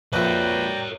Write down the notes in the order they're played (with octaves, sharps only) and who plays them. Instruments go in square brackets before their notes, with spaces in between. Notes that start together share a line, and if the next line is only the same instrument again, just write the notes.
[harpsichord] A#1 A3 [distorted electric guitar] A#4 C#5 [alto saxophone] B4 [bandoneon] D5 G5 A#5